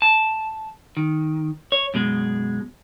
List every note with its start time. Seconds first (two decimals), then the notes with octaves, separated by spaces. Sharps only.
0.02 A5
0.97 D#3
1.72 C#5
1.94 F#2 B2 G#3